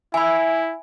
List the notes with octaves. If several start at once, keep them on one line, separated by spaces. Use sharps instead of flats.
E4 E5 G#5 B5